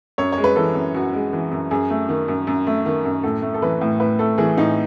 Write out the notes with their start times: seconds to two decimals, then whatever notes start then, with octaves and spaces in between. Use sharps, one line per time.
0.18 F#2 C#5
0.32 C#5
0.38 G#3
0.44 B4
0.56 E3 A4
0.75 F#2
0.94 F#2 F#4
1.13 G#3
1.33 E3
1.52 F#2
1.71 F#2 G#4
1.90 A3
2.09 D#3
2.28 F#2
2.47 F#2
2.67 A3
2.86 D#3
3.05 F#2
3.23 A2 A4
3.42 A3
3.54 A4
3.62 E3 B4
3.81 A2
3.99 A2 B4
4.19 A3 A4
4.38 E3 G#4
4.57 A2 D#4